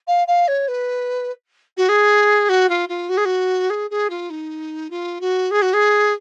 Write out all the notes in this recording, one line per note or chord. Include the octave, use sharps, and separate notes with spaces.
F5
F5
C#5
B4
F#4
G#4
F#4
F4
F4
F#4
G#4
F#4
G#4
G#4
F4
D#4
F4
F#4
G#4
F#4
G#4